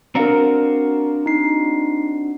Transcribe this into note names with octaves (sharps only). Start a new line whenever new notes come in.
C4 D4 F#4 A#4 F5 A#5
D#4 C7